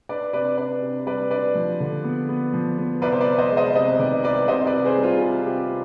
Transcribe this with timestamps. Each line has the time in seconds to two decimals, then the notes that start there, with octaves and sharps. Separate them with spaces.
0.09 D4 B4 D5
0.33 C3 B4 D5
0.57 D4 B4 D5
0.82 C3
1.06 G3 B4 D5
1.30 D4 B4 D5
1.55 F3
1.80 D3
2.04 B3
2.29 B3
2.54 F3
2.78 B3
3.02 C2 B4 D5
3.12 C5
3.21 B4 D5
3.26 C2
3.38 C5 D#5
3.50 G#3
3.57 C5 D#5
3.75 C3 C5 D#5
3.99 D#3 B4 D5
4.24 C2 B4 D5
4.48 C3 C5 D#5
4.67 B4 D5
4.73 C3
4.85 G#4 C5
4.97 G3
5.03 F4 G#4
5.21 C3 F4
5.46 C3 G4